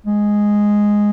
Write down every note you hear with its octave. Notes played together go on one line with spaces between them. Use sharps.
G#3